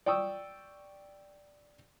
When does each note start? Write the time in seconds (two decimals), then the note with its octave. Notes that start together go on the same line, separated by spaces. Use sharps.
0.06 D5 G5 C#6 D#6 E6